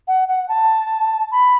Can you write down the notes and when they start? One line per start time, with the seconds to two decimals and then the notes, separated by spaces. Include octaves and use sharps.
0.08 F#5
0.28 F#5
0.49 A5
1.31 B5